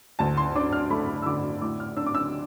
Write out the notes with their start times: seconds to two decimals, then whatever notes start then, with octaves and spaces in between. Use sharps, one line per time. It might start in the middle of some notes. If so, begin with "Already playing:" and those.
0.19 D2 A5
0.37 C6
0.56 D4 D6
0.73 F6
0.90 A3 B5
1.22 E6
1.26 D3 D6
1.61 A2 D6
1.80 F6
1.97 D4 E6
2.06 D6
2.15 E6